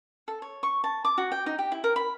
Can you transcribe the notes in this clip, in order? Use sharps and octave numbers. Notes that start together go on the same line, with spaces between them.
A4
C#5
C#6
A5
D6
F#4
G5
D#4
G4
E4
A#4
B5